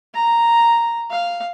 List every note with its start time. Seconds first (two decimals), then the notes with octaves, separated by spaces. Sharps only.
0.14 A#5
1.11 F5